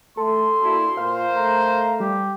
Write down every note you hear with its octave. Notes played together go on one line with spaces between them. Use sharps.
A3 A4 C6
A#3 D4 E4 F#4
A#2 A#4 C5 F5
A3 A#5
G3 G4